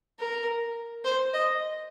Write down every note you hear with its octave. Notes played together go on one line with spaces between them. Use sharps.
A#4
C5
D#5